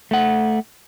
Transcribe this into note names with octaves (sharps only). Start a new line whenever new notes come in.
A3 F#5